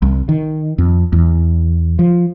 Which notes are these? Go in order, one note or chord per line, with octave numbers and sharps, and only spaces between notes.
C2
D#3
F2
E2
F3